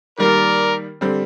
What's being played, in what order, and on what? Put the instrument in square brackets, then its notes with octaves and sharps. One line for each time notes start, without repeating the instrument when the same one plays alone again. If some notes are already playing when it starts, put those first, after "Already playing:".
[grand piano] D#3 G3 A#3 [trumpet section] A#4 D5
[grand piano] D3 G3 C4